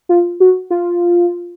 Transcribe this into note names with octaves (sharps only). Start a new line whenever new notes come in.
F4
F#4
F4